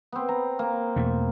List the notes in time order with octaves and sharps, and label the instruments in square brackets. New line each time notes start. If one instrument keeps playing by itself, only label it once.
[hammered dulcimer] B3 C4
A#5
A#3
[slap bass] E2 B2 A3